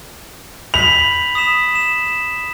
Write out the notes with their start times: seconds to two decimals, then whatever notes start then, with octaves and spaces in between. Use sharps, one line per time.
0.74 B5 B6 F7 F#7
1.35 D#6 B6 E7
1.75 E7